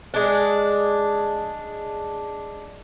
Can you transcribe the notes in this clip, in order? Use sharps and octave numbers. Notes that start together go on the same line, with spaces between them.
G#3 D4